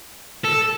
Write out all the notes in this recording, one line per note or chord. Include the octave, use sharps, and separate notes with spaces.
A4